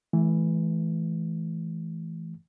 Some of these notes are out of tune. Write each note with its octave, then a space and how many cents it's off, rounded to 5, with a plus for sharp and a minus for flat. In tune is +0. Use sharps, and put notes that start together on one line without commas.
E3 +0 A3 -30